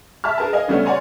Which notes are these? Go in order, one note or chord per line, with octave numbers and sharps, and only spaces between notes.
E5 A5 B5 F6
G#4 A#4 B4 A5
D#5 F5 G#5
C#3 G3 A3 B3 C#4
C#5 D5 F#5 G#5 A#5 C6